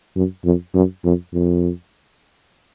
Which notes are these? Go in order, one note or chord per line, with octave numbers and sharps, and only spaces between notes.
F#2
F2
F#2
F2
F2